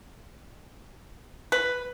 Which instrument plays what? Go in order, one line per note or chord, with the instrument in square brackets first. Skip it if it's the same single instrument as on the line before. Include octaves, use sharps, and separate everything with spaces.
[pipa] B4